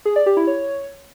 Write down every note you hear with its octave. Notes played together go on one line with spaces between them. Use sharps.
G#4
D5
G4
E4
C#5